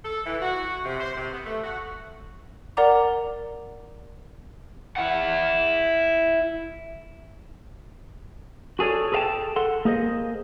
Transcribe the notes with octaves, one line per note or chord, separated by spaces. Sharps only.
A4
E3
F#4
C3
C5
C3
B3
A3
F#4
A#4 D5 F#5 A#5 D6
E4 F#5
F#4 G#4 A4 C#5 D5
G#4 A4 B4 F5 G5 A5
A4 F#5 C6
A#3 G#4 C5 D#5